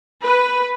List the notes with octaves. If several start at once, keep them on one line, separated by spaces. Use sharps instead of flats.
B4